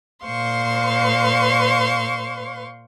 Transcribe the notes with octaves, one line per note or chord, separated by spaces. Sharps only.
A#2 C5 F5 C6 C#6